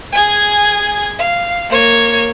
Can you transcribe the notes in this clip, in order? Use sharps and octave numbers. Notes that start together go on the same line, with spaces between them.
G#4 G#5
F5
A#3 C#5